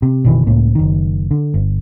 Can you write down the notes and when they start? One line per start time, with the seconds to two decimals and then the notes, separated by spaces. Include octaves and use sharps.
0.02 C3
0.24 F#1 B2 D#3 E3
0.47 C#2 A2 C#3 A#3
0.75 F#1 D#3
1.31 D3
1.54 G1